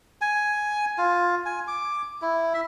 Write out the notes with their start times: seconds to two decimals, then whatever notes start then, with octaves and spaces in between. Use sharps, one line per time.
0.21 G#5
0.98 F4
1.46 G#5
1.68 D6
2.22 E4
2.54 E5